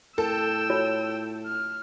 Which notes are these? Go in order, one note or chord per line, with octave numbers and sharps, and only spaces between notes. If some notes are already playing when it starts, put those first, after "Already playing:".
A2 A4 G5 E6
F4 F#4 C#5
F6